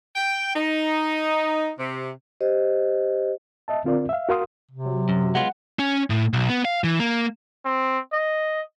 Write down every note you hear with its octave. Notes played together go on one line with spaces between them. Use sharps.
G5
D#4
C3
G4 C5 D#5
D#5 E5 A5
D3 C4 F4 A#4 D5
E5 F5
F#4 A#4 F5 C6 D#6
C3
F#3
F#2
G#3 B3 F4 F#5
C#4
A2
B1
B3
F5
E3
A#3
C4
D#5